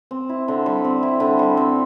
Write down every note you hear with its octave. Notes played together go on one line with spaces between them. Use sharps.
C4
E4
D3
G3
C4
E4
D3
G3
C4